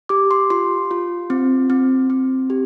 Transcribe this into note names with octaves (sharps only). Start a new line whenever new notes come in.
G4 D6
C6
F4 C6
F4
C4
C4
C4
G4